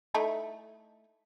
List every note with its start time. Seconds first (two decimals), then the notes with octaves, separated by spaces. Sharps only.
0.14 A3 D#4 E4